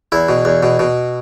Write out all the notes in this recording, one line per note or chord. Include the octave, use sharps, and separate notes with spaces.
E2 E4
B2
E2
B2
B2